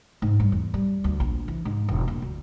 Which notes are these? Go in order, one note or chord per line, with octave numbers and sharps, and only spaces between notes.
G#2
G2
E2
G3
D2
A#1
E3
G#2
E1
A#3
D2